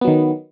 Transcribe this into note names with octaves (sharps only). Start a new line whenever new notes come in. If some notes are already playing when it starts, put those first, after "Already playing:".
D#3 F#3 B3